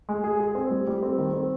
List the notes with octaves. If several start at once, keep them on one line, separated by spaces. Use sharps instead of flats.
G#3
G#4
G#4
C4
G3
G3
C4
D#3
C4